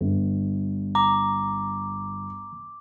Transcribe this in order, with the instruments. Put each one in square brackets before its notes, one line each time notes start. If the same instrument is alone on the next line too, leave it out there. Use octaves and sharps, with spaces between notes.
[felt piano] G1
[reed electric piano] A#5 [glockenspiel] D6